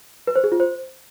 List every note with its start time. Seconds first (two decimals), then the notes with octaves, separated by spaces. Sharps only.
0.27 B4
0.36 C5
0.44 G#4
0.52 F4
0.60 C5